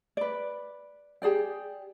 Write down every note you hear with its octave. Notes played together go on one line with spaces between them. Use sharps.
B4 D5
G4 G#4 D5 G5